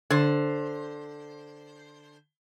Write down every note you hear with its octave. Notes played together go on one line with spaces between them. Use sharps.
D3 C5